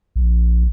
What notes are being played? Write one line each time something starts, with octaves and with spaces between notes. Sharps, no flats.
A#1